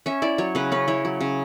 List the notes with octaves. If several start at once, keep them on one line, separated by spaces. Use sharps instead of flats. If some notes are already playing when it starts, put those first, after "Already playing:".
C#4 E5
E4 D5
F#3 C#5
C#3 B4
C#4 B4
E4 C#5
F#3
C#3